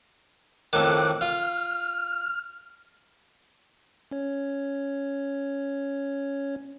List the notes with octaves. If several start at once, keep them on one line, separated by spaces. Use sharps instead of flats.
F2 A2 D#3 D6 F#6
F4 F5 F6
C#4 C#5